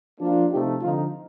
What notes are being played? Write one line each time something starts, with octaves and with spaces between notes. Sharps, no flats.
F3 A#3 D4 F4
C3 F3 A3 D#4 G4
D3 F3 C4 D#4 F4